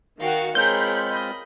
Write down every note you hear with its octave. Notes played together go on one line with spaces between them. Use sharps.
D#3 F#4 F5 G5
G#3 C4 F4 G#4 A#4 C#5 B5 G6
D#5 B5